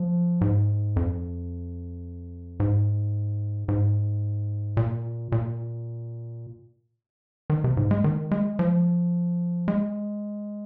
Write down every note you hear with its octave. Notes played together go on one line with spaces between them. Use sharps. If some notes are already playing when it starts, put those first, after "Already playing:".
Already playing: F3
G#2
F2
G#2
G#2
A#2
A#2
D#3
C3
G#2
G#3
D#3
G#3
F3
G#3